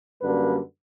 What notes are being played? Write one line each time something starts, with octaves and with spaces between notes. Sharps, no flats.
F#2 D3 G3 A#3 B4